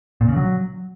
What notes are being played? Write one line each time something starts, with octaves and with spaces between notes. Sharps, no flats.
A#2
C#3
F#3